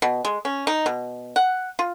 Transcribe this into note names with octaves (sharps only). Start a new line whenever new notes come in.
B2
G#3
C#4
D#4
B2
F#5
F4